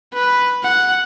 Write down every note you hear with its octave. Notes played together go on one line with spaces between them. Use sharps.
B4
F#5